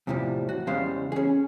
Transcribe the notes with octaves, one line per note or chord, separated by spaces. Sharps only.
E2 A2 C3 F3 G3
F#4
E2 C#3 G3 G#3 C5 F5
C#4 G#4